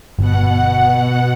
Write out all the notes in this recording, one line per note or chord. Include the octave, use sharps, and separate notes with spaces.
G1 B2 F#5